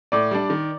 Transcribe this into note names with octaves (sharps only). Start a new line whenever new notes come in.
A2 D5 D6
G3 D4
D#3